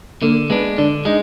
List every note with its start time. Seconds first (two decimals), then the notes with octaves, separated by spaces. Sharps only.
0.22 D3 A#3
0.50 G#3 B3 D4
0.78 D3 D4
1.05 G#3 D#4